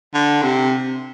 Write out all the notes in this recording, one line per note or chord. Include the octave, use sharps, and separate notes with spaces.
D3
C3